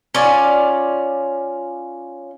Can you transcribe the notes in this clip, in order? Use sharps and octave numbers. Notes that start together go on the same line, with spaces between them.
C#4 F4 D5